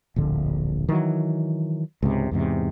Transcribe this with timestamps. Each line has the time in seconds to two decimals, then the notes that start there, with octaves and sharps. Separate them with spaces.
0.16 D1 A#1 D3
0.89 D#3 E3 F#3
2.03 C#2 G#2 C3
2.31 E2 G#2 C3